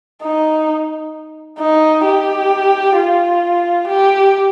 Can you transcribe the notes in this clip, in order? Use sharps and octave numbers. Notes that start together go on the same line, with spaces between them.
D#4
D#4
G4
F4
G4